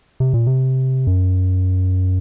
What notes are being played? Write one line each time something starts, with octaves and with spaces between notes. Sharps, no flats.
C3
A#2
C3
F#2